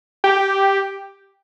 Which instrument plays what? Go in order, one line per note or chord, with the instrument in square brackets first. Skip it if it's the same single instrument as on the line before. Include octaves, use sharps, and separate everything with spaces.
[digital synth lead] G4